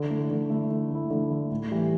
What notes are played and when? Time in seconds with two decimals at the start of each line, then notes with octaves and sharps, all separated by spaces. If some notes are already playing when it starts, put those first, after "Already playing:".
Already playing: D3
0.10 A3 E4
0.30 D3
0.50 A3 E4
0.71 D3
0.91 A3 E4
1.10 D3
1.31 A3 E4
1.51 A2
1.71 E3 G3